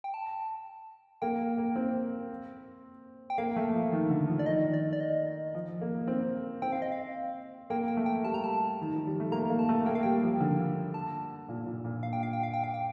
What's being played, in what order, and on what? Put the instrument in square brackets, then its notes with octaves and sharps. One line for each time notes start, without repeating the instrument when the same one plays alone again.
[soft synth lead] G5
A5
[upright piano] A#3 [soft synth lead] G5
[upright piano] A#3
C4
[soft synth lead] G5
[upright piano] A#3 [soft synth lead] F5
[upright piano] A3
F3
D#3
D3
F3
[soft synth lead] D5
[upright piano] D#3 [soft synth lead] D#5
[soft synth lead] D5
D5
D#5
[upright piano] F3
A#3
C4
[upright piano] C4 [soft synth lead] G5
[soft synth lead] F5
D#5
F5
[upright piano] A#3 [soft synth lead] G5
[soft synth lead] G5
[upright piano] A3
[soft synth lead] G5
[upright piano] G3 [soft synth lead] A5
[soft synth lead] A#5
A5
[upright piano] D#3
F3
G3
A3
[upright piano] A#3 [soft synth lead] A#5
[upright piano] A#3
[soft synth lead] A5
[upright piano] A3
[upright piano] A#3 [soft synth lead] G5
[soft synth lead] F5
[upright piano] G3 [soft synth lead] G5
[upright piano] F3
D3
[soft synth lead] A5
[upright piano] A#2
A#2
A#2
[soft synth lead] F5
G5
F5
G5
F5
G5
F5
G5